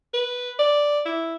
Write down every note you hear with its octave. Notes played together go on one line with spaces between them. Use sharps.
B4
D5
E4